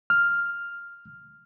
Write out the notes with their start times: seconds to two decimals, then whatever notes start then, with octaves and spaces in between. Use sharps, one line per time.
0.10 F6